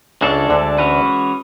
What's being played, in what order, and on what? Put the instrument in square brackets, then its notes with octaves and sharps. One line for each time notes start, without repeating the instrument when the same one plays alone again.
[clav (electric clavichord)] C#2 C#3 [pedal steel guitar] G#3 D4 A4 D5
[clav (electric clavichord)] D2 D3
[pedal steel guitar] E3 G#3 C#4 F#4 B4